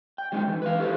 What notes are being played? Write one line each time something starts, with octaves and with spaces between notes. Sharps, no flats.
G5
F#3 G#3 C#4 D#4
E3
B4 F5
E4 G4 A4 B4 C5